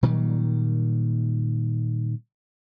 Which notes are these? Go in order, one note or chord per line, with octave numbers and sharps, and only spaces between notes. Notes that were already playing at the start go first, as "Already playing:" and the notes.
A#2 D#3 F#3 G3